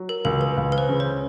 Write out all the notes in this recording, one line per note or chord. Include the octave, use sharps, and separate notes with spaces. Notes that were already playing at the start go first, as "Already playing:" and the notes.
Already playing: F#3
A#4
C#2 A#4
B4
C#2
B4
C5
C#3
C#5